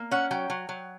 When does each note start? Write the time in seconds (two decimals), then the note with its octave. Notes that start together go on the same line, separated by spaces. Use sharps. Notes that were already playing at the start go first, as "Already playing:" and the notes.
Already playing: A#3
0.11 C#4 F#5
0.31 F#3 G5
0.50 F#3
0.69 F#3